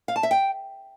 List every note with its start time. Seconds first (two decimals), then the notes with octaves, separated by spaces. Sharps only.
0.08 F5
0.16 A5
0.23 E5
0.31 G5